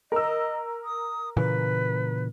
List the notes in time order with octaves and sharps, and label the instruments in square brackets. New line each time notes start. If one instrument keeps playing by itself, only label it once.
[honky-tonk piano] A#4 E6 [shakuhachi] D#5
[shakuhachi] D#6
[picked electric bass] A#2 C#3 E3 [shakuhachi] B4